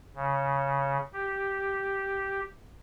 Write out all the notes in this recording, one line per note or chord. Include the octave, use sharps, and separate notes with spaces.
C#3
G4